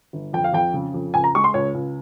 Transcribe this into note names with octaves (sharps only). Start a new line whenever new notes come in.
G1
F2 G5
F5
F2 G5
C#3
F2
C#2 G#5
A#5
G#3 C#6
C6
C#2 C#5
C#2